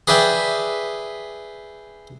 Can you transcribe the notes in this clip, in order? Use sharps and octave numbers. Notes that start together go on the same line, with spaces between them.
G#4 B4 D5 E5 G5